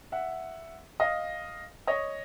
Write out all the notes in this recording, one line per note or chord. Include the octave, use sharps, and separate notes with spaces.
E5 F#5
D#5 F5
C#5 D#5